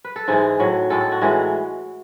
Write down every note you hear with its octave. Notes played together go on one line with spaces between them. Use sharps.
B4
A4
G#2 E3 G#3 G#4
A2 F#3
A2 G#3 A4
A4
F#4
A2 E3 G#3 D#4